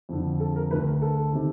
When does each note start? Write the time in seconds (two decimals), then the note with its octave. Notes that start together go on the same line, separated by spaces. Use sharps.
0.09 F2 D3
0.40 A4
0.56 A#4
0.71 D2 D3 B4
0.87 A#4
1.02 A4
1.33 C3 D#3